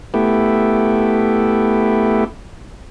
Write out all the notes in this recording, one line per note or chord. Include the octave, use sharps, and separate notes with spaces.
A3 B3 E4 G4